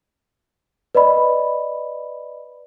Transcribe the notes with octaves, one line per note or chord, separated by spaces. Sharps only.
B4 D5 D#5 B5